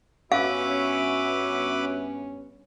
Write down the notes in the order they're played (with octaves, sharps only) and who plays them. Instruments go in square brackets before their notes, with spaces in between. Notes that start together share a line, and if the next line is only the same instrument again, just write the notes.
[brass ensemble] G2 B3 C#4 [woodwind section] F#4 E5 [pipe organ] B4 D6 [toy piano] F5